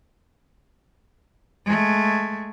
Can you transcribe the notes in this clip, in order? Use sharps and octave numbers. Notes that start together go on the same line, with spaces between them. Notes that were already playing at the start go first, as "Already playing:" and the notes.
G#3 A3